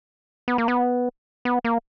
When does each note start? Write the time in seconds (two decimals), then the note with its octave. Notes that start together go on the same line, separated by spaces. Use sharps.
0.48 B3
0.58 A#3
0.68 B3
1.45 B3
1.65 A#3